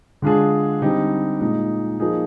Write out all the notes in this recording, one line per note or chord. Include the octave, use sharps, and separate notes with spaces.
D3 G#3 D4 F4 G#4
D3 G3 C4 D#4 G4
A#2 G#3 D#4
F3 A#3 D#4 G#4